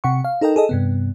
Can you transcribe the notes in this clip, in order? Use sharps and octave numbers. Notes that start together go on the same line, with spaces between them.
C3 F#5 C#6
F5
D#4 A4 A#4 D#5 G5
G#4 A4 D#5
G2 C3 B3